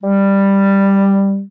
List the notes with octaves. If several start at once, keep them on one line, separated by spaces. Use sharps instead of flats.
G3